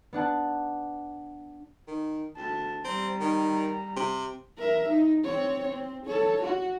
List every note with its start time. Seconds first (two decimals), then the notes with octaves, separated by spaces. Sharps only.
0.13 B3 D4 F#5 A5
1.88 D#3
2.37 D2 A5
2.84 G3 C4 A#5
3.20 D#3
3.96 C3
4.58 A#4 E5
4.89 D#4
5.24 C4 C#5
5.69 C4
6.06 A4 C#5
6.43 F#4